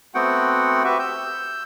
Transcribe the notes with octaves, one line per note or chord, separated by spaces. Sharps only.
A3 B3 C4 F#4 F#5 G5
F#4 G4 B4 E5
E6 G6